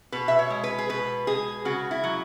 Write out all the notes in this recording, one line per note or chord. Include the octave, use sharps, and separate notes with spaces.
B2 B4
E5
C#5
G#3
B4
G#4
B2 B4
G#3 G#4
C#3 F#4
E4
F#3